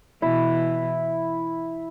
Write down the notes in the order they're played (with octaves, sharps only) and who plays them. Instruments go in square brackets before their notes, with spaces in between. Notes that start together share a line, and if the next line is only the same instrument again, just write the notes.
[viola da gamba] B2 E3 [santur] E4